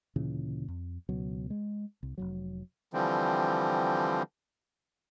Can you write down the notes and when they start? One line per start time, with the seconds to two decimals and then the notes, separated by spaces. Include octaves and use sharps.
0.16 D2 A#2 C#3 E3
0.68 F2
1.09 C#2 B2 F#3
1.50 G#3
2.03 C2
2.18 F1 C#2 F#3
2.94 D3 E3 F3 G3 C4